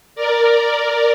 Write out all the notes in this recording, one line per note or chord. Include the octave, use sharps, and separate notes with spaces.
A#4 D5